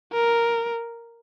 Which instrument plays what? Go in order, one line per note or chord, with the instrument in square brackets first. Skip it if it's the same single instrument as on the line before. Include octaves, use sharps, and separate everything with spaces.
[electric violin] A#4